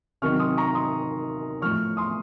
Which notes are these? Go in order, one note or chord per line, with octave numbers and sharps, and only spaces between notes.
C3 D#3 F#3 C#6 F6
C6 D#6
A#5 C#6
C6 D#6
A2 F3 C#6 F6
C6 D#6